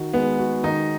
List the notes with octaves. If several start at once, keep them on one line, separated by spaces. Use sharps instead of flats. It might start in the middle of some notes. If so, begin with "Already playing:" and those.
Already playing: D#3 F#4
G#3 B3
F#4
D#3 D#4